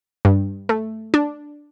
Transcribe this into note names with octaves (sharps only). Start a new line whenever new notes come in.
G2
A3
D4